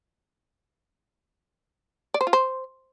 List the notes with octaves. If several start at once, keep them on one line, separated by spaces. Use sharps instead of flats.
D5
C5
F4
C5